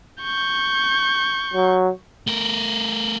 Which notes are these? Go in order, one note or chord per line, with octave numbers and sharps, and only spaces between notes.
C#6 G6
F#3
A3 A#4